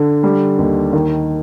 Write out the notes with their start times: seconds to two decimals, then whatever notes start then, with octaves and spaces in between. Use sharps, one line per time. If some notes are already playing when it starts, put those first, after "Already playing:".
Already playing: D3
0.23 G3
0.59 D#2
0.93 D#3